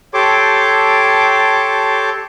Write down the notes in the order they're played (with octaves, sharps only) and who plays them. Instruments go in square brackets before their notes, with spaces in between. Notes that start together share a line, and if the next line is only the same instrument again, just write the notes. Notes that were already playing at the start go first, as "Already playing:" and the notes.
[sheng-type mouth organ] G4 A4 C#5 A5 C6 D6